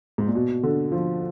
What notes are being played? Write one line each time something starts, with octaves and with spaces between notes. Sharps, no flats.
G#2
A#2
B2
D3
F3